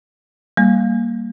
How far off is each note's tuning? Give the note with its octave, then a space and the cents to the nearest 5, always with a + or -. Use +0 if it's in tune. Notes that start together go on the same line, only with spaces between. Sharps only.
G3 +0 A#3 +0